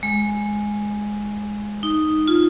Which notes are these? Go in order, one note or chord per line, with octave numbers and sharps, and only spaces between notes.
G#3
D#4
F4